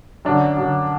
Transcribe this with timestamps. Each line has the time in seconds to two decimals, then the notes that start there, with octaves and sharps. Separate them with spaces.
0.25 F#2 D3 D4
0.57 F#2 D3